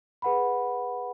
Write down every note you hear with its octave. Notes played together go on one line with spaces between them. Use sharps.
G#4 B4 F#5 B5